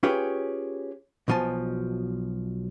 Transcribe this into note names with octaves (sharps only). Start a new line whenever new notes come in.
C#4 F4 G4 G#4 B4 C#5
B1 B2 F3 G#5 A5